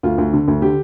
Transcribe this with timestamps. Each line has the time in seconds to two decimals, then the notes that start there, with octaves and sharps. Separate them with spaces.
0.03 D2 F4
0.18 D2
0.33 D3
0.48 D2
0.62 D3 G4